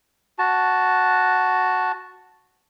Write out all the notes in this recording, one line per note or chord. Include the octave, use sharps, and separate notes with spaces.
F#4 A5